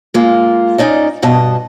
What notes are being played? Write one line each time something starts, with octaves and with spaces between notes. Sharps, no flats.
G#3 A#3 F4
A#2 C#4 D#4 D5 D#5
G2 B2 D#5 A5